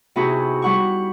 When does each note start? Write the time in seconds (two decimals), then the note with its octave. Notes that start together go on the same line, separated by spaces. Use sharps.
0.16 C3 B3 D#4 E4 F#4 G#4
0.62 G3 F#5 C#6